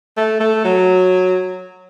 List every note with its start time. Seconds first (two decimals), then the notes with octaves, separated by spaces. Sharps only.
0.17 A3
0.40 A3
0.65 F#3